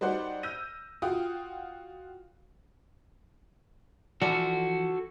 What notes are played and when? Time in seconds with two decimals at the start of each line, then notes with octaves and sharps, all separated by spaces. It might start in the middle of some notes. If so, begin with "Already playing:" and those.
0.01 G3 D#4 F#4 C5 D5 F#5
0.43 E6 F6 G6 A#6 D#7
1.02 F4 F#4 F5 G5 D#6
4.22 E3 F3 F#4 A4 D5